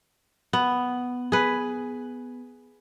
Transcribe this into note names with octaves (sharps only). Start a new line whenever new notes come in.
B3
G#4 B4